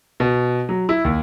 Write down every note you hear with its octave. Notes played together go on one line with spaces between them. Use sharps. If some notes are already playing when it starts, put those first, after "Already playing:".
B2
F#3
E4
D#2